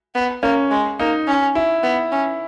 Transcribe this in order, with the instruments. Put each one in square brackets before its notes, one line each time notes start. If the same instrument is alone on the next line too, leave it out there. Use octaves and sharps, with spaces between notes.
[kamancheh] B3
[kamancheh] A#3 [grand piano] C#4
[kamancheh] G#3
[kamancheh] A#3 [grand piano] D#4
[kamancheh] C#4
[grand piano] E4
[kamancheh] B3
C#4